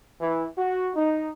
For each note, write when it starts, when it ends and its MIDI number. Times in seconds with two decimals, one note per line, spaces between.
0.21 0.46 52
0.58 0.92 66
0.96 1.31 63